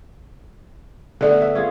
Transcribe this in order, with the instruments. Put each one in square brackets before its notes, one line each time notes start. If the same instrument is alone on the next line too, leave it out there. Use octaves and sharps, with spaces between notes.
[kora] D3 A3 B3 [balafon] A4 D5
[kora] E5
C#4 F4 G#4